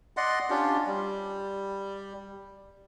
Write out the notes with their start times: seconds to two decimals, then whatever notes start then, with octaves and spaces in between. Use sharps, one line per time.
0.17 D5 D#5 F#5 C6
0.50 C#4 D4 F4 G4
0.87 G3